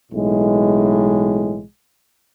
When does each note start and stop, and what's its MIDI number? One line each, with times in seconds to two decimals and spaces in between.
0.12 1.62 35
0.12 1.62 45
0.12 1.62 52
0.12 1.62 56